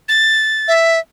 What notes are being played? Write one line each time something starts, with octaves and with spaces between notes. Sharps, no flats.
A6
E5